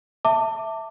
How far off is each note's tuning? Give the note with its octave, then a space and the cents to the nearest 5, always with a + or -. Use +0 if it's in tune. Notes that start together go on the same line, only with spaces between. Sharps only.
E5 -5 A5 +25 D6 +0